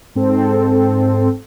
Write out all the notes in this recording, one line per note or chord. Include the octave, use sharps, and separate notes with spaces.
G#2 C4 A4